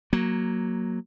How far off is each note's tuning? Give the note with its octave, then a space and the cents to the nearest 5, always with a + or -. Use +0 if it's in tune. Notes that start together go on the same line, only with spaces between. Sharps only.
F#3 +0 A#3 +0